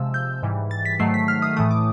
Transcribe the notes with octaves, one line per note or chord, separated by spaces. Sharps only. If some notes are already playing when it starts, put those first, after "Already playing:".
Already playing: C3 F3 G#3 E6
G6
G#2 E3 G3
A6
B6
G#2 D#3 F#3 A3 C7
B6
F6
D#6
A2 E3 A3 D#6
D6